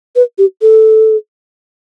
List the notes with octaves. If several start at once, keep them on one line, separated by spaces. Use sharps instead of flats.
B4
G4
A4